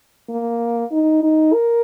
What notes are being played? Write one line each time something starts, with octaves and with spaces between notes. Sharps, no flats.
A#3
D#4
D#4
A#4